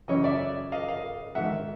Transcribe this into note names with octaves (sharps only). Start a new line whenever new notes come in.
F#2 C#3 E3 C#5 D#5
D5 E5
D#5 F5
D#5 F5
G#2 D#3 E5 F#5